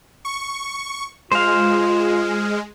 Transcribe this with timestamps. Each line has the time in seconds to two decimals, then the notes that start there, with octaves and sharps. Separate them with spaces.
0.25 C#6
1.32 G#3 F4 C5 F5